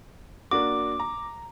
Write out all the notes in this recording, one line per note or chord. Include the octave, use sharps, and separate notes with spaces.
A#3 D4 F#4 D6
A#5